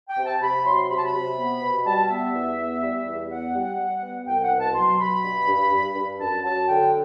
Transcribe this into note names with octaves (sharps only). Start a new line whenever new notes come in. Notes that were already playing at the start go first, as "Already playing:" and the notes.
G5
C3
A5
C3 B5
F#3 C6
C3 B5
A5
B5
C3
B3
B2
G3 A5
B3 E5
E2
B3
G3
E2
B3 F#5
G3
G3
B3
C2 G5
F#5
B2
A5
F#3 C6
B2 B5
G2
G2
G2
G2
F#2 A5
F#3 A5
D3 G5